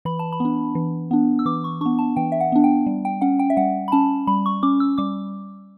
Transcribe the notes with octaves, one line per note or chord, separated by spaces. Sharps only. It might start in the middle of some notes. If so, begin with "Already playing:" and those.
E3 B5
A5
B5
B3 D4
E3
B3 D4
E6
E3 D6
C#6
B3 D4 C#6
A5
E3 G5
E5
F#5
B3 D4
G5
G3
G5
C#4 F#5
G5
E5
G3 F#5
B5
C#4 A5
G3 B5
C#6
C#4 D6
E6
G3 D6